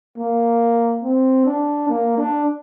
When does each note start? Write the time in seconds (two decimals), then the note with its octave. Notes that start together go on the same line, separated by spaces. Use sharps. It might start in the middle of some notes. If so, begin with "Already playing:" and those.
0.18 A#3
1.03 C4
1.46 D4
1.89 A#3
2.18 D4